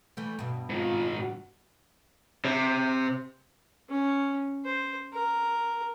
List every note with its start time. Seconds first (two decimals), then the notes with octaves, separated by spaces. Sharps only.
0.17 E3 G3 A3
0.39 G2 B2
0.70 G#2 D#3 F4
1.18 F#4
2.45 C3
3.89 C#4
4.65 C5
5.14 A#4